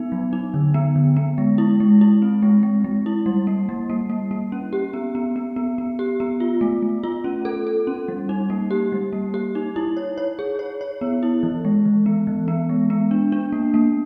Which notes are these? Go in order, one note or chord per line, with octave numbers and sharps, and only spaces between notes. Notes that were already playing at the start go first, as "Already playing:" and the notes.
Already playing: B3 D#4
F#3
D#4
D3
B3
D3
B3
G#3
E4
G#3
E4
C4
G#3
G#3
G#3
E4
G3
A#3
G3
A#3
A#3
A#3
C#4
G4
B3
B3
B3
B3
B3
G4
B3
F4
A3
A3
F4
C#4
A4
A4
C#4
G3
D#4
A#3
G4
G3
A#3
G4
D#4
E4
C#5
C#5
G#4
C#5
C#5
B3
E4
E3
G#3
E3
B3
E3
B3
G#3
B3
D4
D4
A#3
A#3